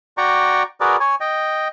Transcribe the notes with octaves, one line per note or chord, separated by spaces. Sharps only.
F#4 D5 G5 A#5 C#6
F#4 G#4 A#4 B4 D5
C#5 G#5
D#5 G5